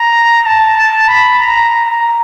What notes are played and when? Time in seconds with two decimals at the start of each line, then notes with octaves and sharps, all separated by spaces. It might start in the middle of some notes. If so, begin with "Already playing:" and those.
Already playing: A#5
0.46 A5
0.77 A5
1.08 B5
1.39 A#5
1.85 A#5